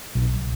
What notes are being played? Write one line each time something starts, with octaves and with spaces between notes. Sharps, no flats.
B1